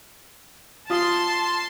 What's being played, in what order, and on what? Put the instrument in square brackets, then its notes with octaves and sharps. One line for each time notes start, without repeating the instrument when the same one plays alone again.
[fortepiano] F4 D#6 [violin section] A5 C6